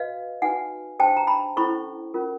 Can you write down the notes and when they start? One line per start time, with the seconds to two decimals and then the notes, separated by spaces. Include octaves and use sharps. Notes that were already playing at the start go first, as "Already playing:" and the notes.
Already playing: F#4 B4 D#5 F5
0.42 D#4 F#4 B4 F#5 G#5
0.99 D4 G4 C5 G5 A5
1.17 A#5
1.27 A5 B5
1.56 C#4 E4 A4 C5 B5 C#6
2.14 C#4 F4 A#4